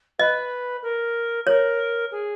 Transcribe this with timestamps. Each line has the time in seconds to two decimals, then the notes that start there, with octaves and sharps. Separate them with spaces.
0.19 B4 D#5
0.82 A#4
1.47 A#4 C#5
2.11 G#4